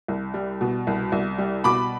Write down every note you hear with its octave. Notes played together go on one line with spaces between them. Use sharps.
C2
G3
B2
C2
C2
G3
B2 B5 D6